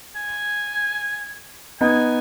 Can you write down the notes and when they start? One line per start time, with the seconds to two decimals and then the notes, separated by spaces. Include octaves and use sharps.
0.16 G#5
1.81 B3 D#4 G#5